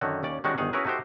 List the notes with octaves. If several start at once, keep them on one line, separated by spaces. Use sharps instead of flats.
F#2 D3 D#3 F#4
D#2 C#4 D5
D#3 G3 G#3 C#4 D4 F#4
G1 D#3 G#4 F5 F#5
C#4 E4 F#4 G#4 A#4 B4
A3 D#4 F#4 G4 C5